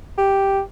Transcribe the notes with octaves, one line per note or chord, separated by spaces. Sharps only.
G4